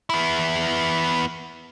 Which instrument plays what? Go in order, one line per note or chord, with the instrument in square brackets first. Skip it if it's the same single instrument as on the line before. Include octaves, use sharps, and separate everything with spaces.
[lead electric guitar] B3 E4